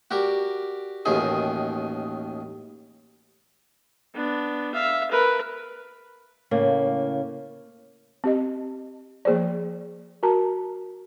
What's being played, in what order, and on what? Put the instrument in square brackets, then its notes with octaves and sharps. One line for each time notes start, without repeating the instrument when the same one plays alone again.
[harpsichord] F#4 G4 A#4 D5
A1 D#2 B2 D#3 G#4 D#5
[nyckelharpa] B3 D4
E5 F5
A#4 B4
[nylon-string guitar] A2 C#3 A#3
[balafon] C4 G4 D#5
F3 A#3 G#4 C5 D5
F#4 A#4 A5 A#5